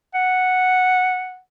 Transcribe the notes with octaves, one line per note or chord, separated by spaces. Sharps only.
F#5